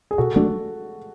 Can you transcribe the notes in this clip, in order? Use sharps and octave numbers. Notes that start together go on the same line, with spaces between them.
G#4
B2 F#4 A4
F#3 A3 D4 F#4 A4